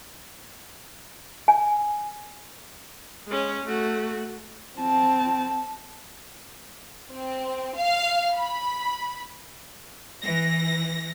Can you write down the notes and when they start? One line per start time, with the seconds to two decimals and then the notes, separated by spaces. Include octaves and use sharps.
1.48 G#5
3.27 G#3 C#4
3.64 A3 F#4
4.78 C4 A5
7.12 C4
7.78 F5
8.36 B5
10.23 E3 A#6